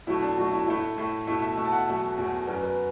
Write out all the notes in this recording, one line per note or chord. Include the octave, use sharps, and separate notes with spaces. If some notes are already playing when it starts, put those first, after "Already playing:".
B2 F#3 A3 E4
D4
B2 F#3 A3 F#4
E4
A2 A3 E4
A2 A3
B2 A3 E4
E5
B2 A3 E5
A5
F#5
E2 B2 F#3 A3 E5
E2 B2 F#3 A3
F#2 F#3 B3 D5
B4